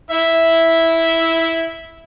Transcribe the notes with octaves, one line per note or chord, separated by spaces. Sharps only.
E4 E5